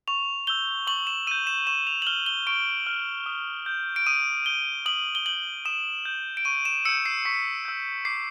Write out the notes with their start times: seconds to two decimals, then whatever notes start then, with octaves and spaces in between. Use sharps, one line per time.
0.08 C#6 F7
0.47 E6 G6 G7
0.87 C#6 F#7
1.07 E7
1.27 E6 D#7
1.31 G6
1.47 E7
1.67 C#6 E7
1.87 F7
2.02 F#7
2.07 F6 G7
2.26 G7
2.47 C#6 D7
2.87 F6
3.26 D#6
3.66 G6
3.96 D7
4.06 D#6 D#7
4.46 G6 G7
4.86 D#6 F#7
5.15 G7
5.26 G6 F#7
5.65 D#6 E7
6.05 G6
6.37 D7
6.45 C#6 D#7
6.65 E7
6.85 E6 C#7
6.89 G6
7.06 C7
7.25 C#6 B6
7.65 E6 G6
8.05 D6 C7